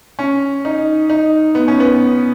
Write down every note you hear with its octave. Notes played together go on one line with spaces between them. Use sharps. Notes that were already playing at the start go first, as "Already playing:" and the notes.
C#4
D#4
D#4
B3
C#4
B3